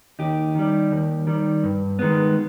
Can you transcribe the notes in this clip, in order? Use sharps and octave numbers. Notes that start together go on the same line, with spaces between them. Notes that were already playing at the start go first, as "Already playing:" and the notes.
D#2 D#4 G4
D#3 G3
D#2
D#3 G3
G2
D#3 G#3 B3